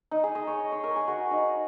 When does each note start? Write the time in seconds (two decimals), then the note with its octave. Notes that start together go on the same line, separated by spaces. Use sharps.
0.11 D#4
0.23 G#4
0.35 D#5
0.47 C#5
0.59 D#5
0.72 C#5
0.84 A#4
0.96 G#4
1.08 F#4
1.31 D#4